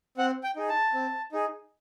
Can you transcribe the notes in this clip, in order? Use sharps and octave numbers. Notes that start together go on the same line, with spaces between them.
C4 F#5
G5
D#4 G#4
A5
C4
D#4 G#4